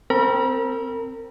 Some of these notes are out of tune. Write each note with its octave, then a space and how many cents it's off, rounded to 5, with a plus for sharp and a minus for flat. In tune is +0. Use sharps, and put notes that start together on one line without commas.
C4 +0 A#4 -30 B5 -40